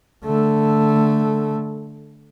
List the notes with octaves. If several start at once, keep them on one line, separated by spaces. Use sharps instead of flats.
D3 A3